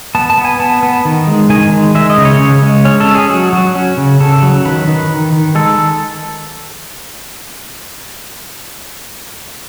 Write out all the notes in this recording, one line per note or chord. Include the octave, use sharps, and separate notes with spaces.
B3 A5
A5
B3
G#5
B3 A5
B3
D#3
G#3
D#3 G#5
G#3
G#3 E5
D#5
C#3
C#5
C#3
G#3
C#4 C#5
A4
C#4
G#4
F#3 F#4
F#3
C#4
C#3
C#3 A4
F#3
D#3 B4
D#3
D#3
D#3
G#3 A4